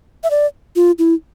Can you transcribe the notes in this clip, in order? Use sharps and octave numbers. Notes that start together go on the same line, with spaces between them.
E5
D5
F4
E4